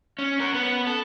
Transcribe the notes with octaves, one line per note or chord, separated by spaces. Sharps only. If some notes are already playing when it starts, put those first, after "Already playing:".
C#4
C#4 A#4
B3
A4